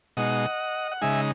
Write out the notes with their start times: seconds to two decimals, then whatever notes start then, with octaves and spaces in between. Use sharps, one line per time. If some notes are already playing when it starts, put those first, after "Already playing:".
0.17 B2 G#3 D#4 D#5 F#5
0.92 F#5
1.01 C#3 G#3 D#4 E5 G#5